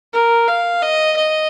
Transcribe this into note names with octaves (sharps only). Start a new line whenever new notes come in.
A#4
F5
D#5
D#5